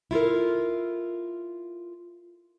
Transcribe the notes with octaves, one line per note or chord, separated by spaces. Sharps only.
E4 F4 A4 A#4